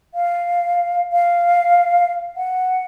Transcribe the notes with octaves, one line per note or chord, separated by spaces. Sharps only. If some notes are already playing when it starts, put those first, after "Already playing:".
F5
F5
F#5